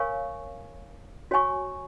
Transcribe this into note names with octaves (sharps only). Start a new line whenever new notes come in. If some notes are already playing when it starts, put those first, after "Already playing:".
Already playing: A#4 C#5 F5 G#5 C#6
F#4 C#5 G#5 C#6